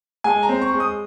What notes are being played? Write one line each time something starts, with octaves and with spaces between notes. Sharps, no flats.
G#3 G#5
A#5
C4
C#6
G#3
D#6